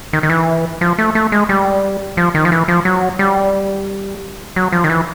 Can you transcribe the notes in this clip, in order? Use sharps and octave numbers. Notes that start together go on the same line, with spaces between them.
D#3
D#3
E3
F3
A3
A3
G#3
G3
F3
D#3
F3
E3
F3
F#3
G3
F#3
F3
D#3
E3